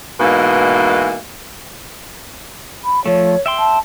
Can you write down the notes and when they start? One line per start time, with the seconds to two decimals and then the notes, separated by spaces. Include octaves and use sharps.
0.20 G#2 B2 E3 A#3
2.85 B5
3.06 F3 A3 C#5
3.46 E5 G5 C6
3.59 A5